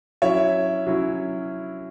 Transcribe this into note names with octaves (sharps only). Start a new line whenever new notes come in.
F#3 C#4 E4 C#5 E5
F#3 C#4 E4